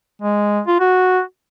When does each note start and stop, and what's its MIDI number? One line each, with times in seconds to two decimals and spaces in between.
0.22 0.60 56
0.67 0.77 65
0.80 1.21 66